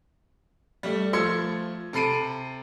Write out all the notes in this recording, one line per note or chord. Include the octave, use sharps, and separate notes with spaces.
G3 A3
F3 A3 C6 E6 G#6 C#7
C3 A4 B5 C7 D7 D#7